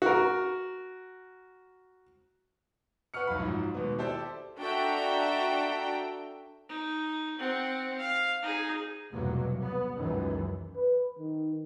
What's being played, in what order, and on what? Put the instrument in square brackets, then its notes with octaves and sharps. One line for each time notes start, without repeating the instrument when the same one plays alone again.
[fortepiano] F#4 A#4
[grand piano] B4 F#5 C#6 F6 C#7
B1 F#2 F5 B5
G#2 F3 F#3
D#2 B2 G#3 B3
E4 G4 A4 C5 D5
[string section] D4 F#4 A4 E5 G5 A#5
[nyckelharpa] D#4
C4 F#5
F5
D#4 G#4
[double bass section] F1 E2 G2 B2 F#3 A#3
B3
C#2 F#2 D#3 E3
[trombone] B4
D#3